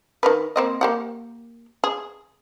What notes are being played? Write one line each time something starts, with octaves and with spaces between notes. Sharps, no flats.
D#3 A#4 B4
A#3 C4 D#5
A#3 G4 F#5
G#4